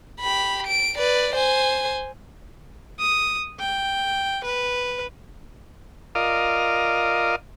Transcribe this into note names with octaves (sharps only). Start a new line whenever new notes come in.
G4 B5
D7
B4 D5
C5 G#5
D#6
G5
B4
F4 A#4 D5 D#5 F5